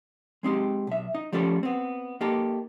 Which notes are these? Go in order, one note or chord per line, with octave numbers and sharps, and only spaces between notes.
G#3 C4 D#4 G4
B1 E5
D#4
F3 G3 A3 C#4 A4 D5
B3 C4
A#3 D#4 G4 A4